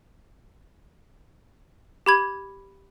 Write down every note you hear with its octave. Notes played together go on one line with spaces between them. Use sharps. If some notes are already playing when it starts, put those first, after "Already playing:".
G4 B5 G#6